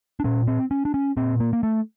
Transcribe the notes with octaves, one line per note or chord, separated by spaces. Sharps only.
D4
A#2 C#4
C4
C#4
D4
C#4
A#2 C4
A#3
A#3
A3